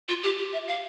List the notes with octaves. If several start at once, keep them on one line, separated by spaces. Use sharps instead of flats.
F4
G4
G4
E5
F5